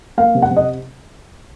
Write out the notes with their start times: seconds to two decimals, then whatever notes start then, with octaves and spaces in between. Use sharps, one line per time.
0.18 A#3 F5
0.35 C3
0.42 F#5
0.51 C3
0.57 D#5